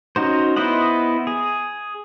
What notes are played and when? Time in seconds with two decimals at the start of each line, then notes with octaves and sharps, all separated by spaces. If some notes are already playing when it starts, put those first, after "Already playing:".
0.16 C#4 D#4 F#4 C5
0.56 B3 E4 C5 D#5 F#5
1.27 G#4